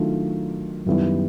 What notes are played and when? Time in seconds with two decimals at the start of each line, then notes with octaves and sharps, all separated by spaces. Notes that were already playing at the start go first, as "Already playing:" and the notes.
Already playing: D#3 F#3 A3 D4 F4
0.86 F#2 D#3 G3 B3 E4